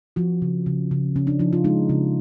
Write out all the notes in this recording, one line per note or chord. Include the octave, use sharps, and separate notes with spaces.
F3 F#4
C#3
C#3
C#3
C#3 C#4
D4
F3 D#4
F4
G#3 D#4
C#3